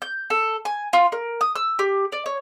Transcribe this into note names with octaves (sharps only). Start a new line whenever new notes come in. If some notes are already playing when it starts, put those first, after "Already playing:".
G6
A4
G#5
F4
A#4
D#6
E6
G4
D5
C#5